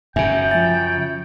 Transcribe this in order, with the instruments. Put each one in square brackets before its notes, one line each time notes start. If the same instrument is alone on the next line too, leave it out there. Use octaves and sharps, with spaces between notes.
[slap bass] F#2 C#3 [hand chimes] E5 G#5 [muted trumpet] G5
[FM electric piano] F3 E5 [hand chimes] A6